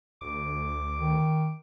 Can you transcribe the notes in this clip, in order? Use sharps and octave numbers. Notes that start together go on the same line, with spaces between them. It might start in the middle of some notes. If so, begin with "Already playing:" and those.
D2 D6
D#3